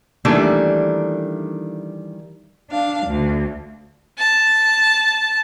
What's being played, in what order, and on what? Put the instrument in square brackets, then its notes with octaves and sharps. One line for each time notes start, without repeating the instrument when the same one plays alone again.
[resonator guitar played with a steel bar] D#3 E3 G3 A3 A#3 D4
[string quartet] D4 F5
D2
[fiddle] A5